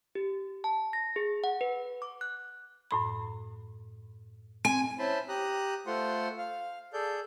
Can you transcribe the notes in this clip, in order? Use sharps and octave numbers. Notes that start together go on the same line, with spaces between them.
G4
A5
A#6
G#4
F#5
B4
D6
F#6
F#2 A2 B5
C4 G#5
C#4 E4 C5 A5 B5 C6
G4 A#5 D#6 F#6
A3 F4 C5 F#5 C6
F5
G#4 A4 D5 G6